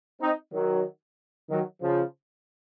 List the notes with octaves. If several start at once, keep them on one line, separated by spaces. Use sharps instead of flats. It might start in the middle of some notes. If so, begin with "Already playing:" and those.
C4 D#4
D#3 F#3
D#3 F#3
C#3 F3